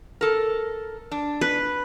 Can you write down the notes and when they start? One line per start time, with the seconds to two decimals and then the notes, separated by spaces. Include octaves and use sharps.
0.21 A4 A#4
1.11 D4
1.41 B4